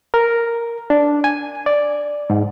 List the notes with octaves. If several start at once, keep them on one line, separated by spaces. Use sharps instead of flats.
A#4
D4
G#5
D5
G#2